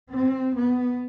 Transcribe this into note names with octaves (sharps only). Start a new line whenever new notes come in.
C4
B3